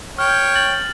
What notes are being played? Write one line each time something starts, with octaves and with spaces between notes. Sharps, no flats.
C#5 G5 F6
A6 F#7